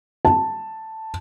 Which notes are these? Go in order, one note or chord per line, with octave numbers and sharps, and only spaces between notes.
A5